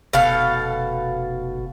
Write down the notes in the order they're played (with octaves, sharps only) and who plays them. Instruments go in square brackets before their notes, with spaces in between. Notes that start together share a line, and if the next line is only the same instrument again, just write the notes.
[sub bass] F1 [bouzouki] B2 A4 F5